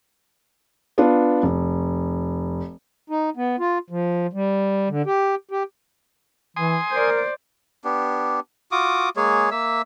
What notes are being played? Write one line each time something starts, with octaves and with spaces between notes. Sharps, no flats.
B3 D4 F4
F1
D#4
B3
F4
F3
G3
D3
G4
G4
E3 G#5 C6 D#6
A#4 C5 D5
B3 D4 G4
F4 F#4 D6 D#6
G#3 A#3 G#4 C#5
A#3 E5 E6